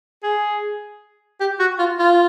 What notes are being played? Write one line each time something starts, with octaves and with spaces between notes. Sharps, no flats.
G#4
G4
F#4
F4
F4